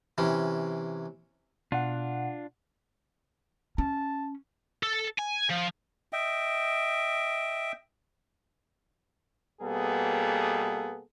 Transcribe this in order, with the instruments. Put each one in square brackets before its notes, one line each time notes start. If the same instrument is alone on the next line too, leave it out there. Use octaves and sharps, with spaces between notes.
[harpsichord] C3 E3 C#4
[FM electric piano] B2 F#5 [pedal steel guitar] D4 F4
[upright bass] C#4 [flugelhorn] A5
[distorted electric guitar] A4
G#5
F3
[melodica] D#5 E5 G5
[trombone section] B2 G3 A#3 B3 G#4 A4